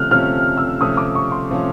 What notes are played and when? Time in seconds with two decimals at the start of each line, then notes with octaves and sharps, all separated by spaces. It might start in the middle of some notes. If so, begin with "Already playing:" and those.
Already playing: C3 F3 A3 C#4 F6 F#6
0.11 C3 F3 A3 C#4 F6
0.57 E6
0.81 C3 F3 A3 C#4 D#6
0.97 D6
1.15 C#6
1.32 C6
1.50 C3 F3 A3 C#4